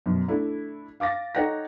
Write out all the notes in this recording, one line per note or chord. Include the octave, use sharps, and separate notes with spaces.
F#2 B2
A3 D4 E4
F5 D6 A6 A#6
D#4 A4 C#5 F#5 G5 A#6